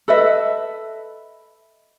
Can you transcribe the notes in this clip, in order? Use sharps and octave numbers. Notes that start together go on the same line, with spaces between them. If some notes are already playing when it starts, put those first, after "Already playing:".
A4 B4 D#5 E5